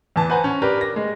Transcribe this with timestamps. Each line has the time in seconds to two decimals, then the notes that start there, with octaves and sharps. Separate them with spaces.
0.16 E2 E3 A5
0.30 B4 C5 F#5 G#5 A#5
0.44 C#4
0.62 D4 G4 A#4 B4
0.81 A#6
0.96 G#3